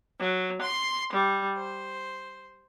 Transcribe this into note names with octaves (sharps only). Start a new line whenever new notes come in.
F#3
C6
G3
C5